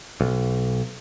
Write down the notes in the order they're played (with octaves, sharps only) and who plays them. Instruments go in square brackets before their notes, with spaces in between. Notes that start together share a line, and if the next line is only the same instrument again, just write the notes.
[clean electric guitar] B1